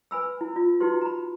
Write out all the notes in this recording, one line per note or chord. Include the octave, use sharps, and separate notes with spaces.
B4 G#5 B5 E6
E4
F4
D#4 E4 F#4 G4 B4 C6
A#5 B5